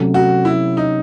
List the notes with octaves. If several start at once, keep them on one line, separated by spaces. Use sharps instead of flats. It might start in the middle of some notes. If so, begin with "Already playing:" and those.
Already playing: C3 F#3 A3 C#4
F#4
E4
D#4